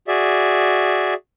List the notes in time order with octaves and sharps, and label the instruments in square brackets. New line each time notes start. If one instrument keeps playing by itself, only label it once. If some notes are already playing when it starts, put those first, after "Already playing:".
[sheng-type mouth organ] F#4 G#4 D5 E5